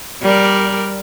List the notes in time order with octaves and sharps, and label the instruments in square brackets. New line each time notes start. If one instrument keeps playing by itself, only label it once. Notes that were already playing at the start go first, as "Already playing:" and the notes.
[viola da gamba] G3 A#4 D5